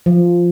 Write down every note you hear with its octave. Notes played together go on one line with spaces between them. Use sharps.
F3